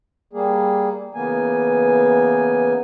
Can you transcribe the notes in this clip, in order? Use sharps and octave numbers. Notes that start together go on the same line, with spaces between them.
G3 A#3 G#4
C#3 E3 A#3 B3 G#5